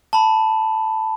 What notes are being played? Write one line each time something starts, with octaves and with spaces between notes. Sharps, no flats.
A5 B5